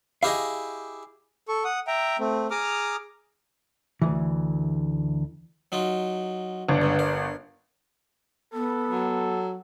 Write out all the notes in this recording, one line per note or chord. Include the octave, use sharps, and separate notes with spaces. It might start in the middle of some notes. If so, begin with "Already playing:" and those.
E4 G4 G#4 D#5 F5
A4 C#6
F#5 D#6
E5 G5 A#5
A3 C4
G#4 A#5 D6 D#6 F6
D2 E3
F#3 D#4 F4
G1 D4
C#2 G2
A#4
B3 A4
F#3